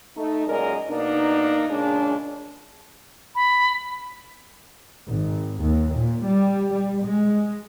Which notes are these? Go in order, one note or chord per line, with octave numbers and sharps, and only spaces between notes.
A3 D#4
F#2 A#2 G#3 A#4 D5 D#5
B2 A#3 D4 D#4
A#2 C#3 G#3 D4
B5
G#1
D#2
A#2
G3
G3
G#3